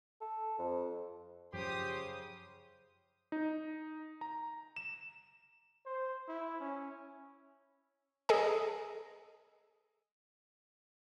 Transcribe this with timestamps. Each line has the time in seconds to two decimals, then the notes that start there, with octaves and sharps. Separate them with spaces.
0.21 A4
0.59 F2
1.54 F#2 C#3 F3 C#4 G4 C5 C6 D#6
3.32 D#4
4.21 A#5
4.76 E7
5.86 C5
6.28 E4
6.60 C#4
8.29 G#4 A4 D#5 G#5